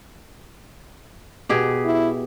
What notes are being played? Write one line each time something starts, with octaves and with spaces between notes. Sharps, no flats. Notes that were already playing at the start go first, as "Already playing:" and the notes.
B2 G4 G#4
E4